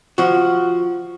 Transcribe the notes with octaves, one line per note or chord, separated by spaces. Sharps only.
F3 F#4